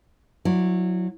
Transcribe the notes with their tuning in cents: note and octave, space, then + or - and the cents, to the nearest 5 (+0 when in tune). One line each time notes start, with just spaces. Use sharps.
F#3 -20 E4 +0 D5 -10